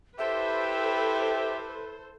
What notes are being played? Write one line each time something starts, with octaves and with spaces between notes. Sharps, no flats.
E4 G4 A4 B4 C5 E5